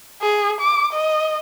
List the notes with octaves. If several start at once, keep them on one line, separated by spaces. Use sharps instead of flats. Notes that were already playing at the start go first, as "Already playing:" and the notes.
G#4
D6
D#5